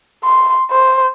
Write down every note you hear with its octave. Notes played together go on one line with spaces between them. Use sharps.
C6
C5